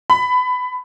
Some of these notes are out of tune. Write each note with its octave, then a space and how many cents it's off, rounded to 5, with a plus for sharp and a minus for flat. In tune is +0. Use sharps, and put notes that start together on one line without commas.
B5 +20